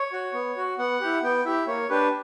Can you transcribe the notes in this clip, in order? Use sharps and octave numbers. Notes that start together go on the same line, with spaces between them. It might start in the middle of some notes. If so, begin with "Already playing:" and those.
Already playing: C#5
F#4
B3
F#4
B3 F#5
E4 G4
B3 G5
E4 G4 E5
A#3 C#5
D4 G4 B4